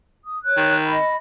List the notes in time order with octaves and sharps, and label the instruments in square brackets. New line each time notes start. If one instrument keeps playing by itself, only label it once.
[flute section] D#6
C#5 F#6
[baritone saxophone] D#3
[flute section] D#5 B5